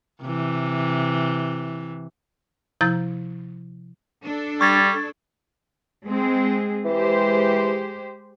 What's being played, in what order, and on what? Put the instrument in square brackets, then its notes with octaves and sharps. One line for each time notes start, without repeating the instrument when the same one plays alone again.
[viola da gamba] C3 E3
[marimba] C3 F3 E4 A#5 G6 A6
[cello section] D4 A4
[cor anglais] G3 [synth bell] C#6 G#6 A6
[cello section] G#3 C4 G#4
[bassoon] E3 [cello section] G#3 G4 C5